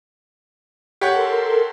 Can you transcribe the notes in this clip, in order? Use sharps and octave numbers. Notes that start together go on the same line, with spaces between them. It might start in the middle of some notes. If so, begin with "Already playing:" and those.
G4 A4 A#4 C#5 F#5 C6